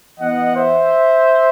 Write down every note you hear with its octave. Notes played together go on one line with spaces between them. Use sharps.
E3 B3 D#5 F#5
C5 E5